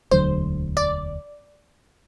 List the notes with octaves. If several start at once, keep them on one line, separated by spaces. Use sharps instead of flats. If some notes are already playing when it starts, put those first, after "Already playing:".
E1 D2 D3 F#3 C5
D5